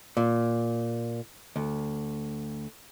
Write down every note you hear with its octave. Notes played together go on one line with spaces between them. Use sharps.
A#2
D2